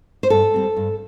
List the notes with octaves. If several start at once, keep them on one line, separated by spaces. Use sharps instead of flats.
C5
G2 A4
G3 C4
G2